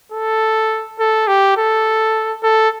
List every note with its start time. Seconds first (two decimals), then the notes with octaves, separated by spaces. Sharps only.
0.12 A4
0.99 A4
1.27 G4
1.57 A4
2.43 A4